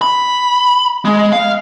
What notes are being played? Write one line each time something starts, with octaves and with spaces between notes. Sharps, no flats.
B5
G#3
F5